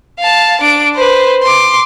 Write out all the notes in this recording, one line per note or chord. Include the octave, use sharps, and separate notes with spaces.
F5 A5
D4 D7
B4 C5
C6 D6